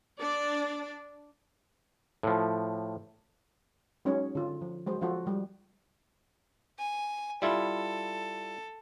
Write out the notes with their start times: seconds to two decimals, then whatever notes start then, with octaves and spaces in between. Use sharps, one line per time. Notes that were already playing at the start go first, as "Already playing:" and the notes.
0.18 D4 D5
2.23 A2 F3
4.05 F#3 G#3 C#4 D#4 C#5
4.35 D3 F4
4.61 F3
4.86 F#3 G#3 C5
5.01 F3 F4 F#4 A4
5.26 G3 G#3
6.78 G#5
7.42 G3 E4 F4 A4